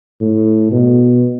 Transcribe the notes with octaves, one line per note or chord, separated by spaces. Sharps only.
A2
B2